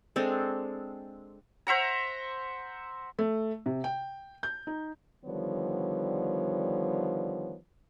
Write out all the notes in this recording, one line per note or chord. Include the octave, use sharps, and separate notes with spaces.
G#3 C4 D4 A4
C5 E5 F#5 A#5
A3
C3
G5
G6
D#4
D3 D#3 F3 G3 B3 C#5